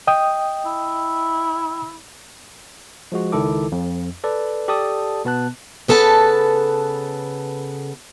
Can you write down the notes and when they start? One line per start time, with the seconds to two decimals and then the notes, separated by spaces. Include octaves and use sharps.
0.07 D#5 G5 D#6
0.66 E4
3.12 F3 G#3 F#4
3.32 C#2 D#3 E4 A4 D6
3.72 F2
4.24 A4 B4 D5
4.68 G4 A4 D5 A5 D#6
5.25 B2 B3 A5 F#6
5.88 C#3 B3 A4 B4 A5